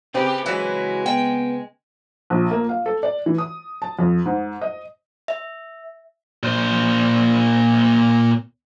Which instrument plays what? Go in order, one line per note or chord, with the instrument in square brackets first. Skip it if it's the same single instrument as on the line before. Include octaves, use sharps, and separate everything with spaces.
[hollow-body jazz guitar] C#3 C4 B4 [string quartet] G4
[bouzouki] E3 F#3 E4 [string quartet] G#3
[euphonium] B3 [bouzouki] G5
[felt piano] A#1
A#3
F5
A4
D5
E3
D#6
A5
F2
G#2
D#5
[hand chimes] E5
[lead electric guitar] A#2 C5